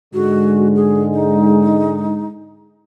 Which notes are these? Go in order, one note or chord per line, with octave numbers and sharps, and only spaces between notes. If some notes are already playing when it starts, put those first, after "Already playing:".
G#2 D3 G#3 F#4
G#4
D#4